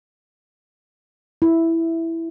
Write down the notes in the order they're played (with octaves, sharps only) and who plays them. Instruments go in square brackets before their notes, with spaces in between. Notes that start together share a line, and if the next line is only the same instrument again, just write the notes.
[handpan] E4